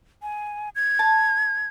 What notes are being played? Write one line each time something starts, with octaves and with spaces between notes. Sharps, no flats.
G#5
G#6
A5